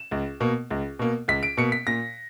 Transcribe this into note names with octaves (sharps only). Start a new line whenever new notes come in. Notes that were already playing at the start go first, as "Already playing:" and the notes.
Already playing: E7
C#2
B2 A#3
C#2
B2 A#3
C#2 B6
D7
B2 A#3 C#7
B6
A#2 A#6